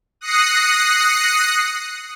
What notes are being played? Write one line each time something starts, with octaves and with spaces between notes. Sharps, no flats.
D#6 F#6 A#6 C7 C#7